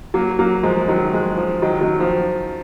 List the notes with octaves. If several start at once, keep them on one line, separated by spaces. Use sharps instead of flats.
F#3 A#3
F#3 A#3
F3 G#3
D#3 F#3
F3 G#3
F3
D#3 F#3
D#3 F#3
F3